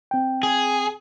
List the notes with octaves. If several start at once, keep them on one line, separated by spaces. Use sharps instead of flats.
C4 G5
G#4